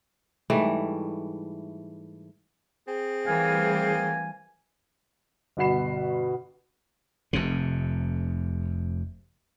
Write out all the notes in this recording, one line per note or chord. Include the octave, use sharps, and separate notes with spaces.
G#2 E3 G3 A3
C4 G#4
E3 G3 A3 A#4 F5 G#5
G1 B2 F#4 B5 C7 E7
F1 F2 C3